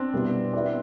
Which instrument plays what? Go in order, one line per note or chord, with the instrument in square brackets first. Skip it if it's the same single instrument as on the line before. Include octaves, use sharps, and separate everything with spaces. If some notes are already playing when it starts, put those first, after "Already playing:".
Already playing: [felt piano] C4 D4
[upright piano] B2 G3 B3 E4
B3 E4 G4 D5